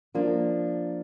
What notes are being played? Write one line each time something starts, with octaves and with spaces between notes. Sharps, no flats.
F3 A#3 D4